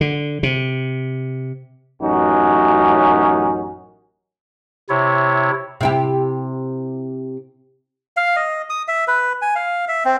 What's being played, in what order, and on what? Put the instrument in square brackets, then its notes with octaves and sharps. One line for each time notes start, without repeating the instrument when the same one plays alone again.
[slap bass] D3
C3
[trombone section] A1 F#2 C#4 D#4 F#4
[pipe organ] C3 E4 C#5
[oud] C3 E4 G4
[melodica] F5
D#5
D#6
E5
B4
G#5
F5
E5
C4